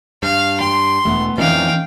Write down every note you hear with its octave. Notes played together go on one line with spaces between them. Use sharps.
G2 F5
G5 C6
E1 A3 B3
F2 A#2 E3 C#4 D#4 F5 G5